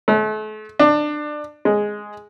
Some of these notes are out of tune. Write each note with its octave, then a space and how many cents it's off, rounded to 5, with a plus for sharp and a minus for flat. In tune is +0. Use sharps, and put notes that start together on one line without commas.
A3 -40
D4 +25
G#3 +0